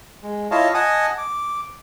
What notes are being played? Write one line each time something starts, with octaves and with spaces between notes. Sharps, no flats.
G#3
E4 F4 C#5 D#5 F5 A5
D#5 F#5 G#5 A5 D#6
D6